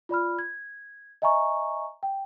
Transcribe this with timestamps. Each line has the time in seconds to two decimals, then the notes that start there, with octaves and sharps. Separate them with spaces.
0.09 F4 D5 B5 F6
0.39 G#6
1.22 D#5 E5 G#5 A#5 C#6
2.03 G5